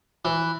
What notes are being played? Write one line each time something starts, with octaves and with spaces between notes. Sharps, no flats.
E3